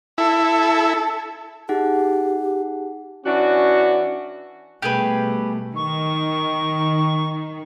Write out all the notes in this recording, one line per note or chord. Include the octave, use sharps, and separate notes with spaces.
E4 A4
D#4 G4 G#4 F#5
E3 C#4 D4 F#4
B2 G3 A3 G4 G#4 B4
D#3 C#6